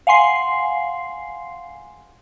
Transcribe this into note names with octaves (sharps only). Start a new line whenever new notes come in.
F5 F#5 G#5 C6 C7